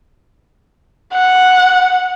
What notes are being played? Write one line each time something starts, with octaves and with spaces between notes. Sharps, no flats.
F#5